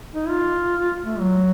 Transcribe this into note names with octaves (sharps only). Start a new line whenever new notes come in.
D#4
F4
A3
F#3